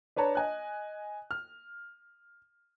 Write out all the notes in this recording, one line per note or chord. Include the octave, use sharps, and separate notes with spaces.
D4 B4 C#5 A5 A#5
D#5 G#5 F#6
F6